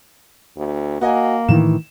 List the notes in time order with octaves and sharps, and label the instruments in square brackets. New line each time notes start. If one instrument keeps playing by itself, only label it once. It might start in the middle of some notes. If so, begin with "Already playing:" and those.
[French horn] D2
[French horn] A#3 [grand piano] F#4 D#5 G#5
[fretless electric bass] A2 D#3 E3 [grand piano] E7